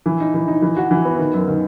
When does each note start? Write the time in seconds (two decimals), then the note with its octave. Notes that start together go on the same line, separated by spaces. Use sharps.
0.06 E3
0.20 D#4
0.34 E3
0.48 D#4
0.62 E3
0.77 F#4
0.91 E3
1.05 B3
1.19 D#3
1.34 F#2
1.48 D#3